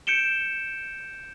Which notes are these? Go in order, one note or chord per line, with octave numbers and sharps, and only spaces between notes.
G6 C#7 D7 E7 G7